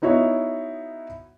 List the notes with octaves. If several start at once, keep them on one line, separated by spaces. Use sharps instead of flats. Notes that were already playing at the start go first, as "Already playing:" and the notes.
B3 D#4 E4 F#4 C#5